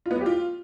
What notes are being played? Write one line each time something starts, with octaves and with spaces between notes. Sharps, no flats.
F4
B3
F#3
G4
F4